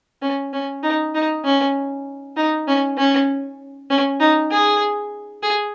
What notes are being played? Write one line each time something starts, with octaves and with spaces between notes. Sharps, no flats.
C#4
C#4
D#4
D#4
C#4
D#4
C#4
C#4
C#4
D#4
G#4
G#4